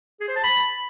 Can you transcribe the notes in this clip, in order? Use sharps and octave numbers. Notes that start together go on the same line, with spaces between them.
G#4
C5
A5
B5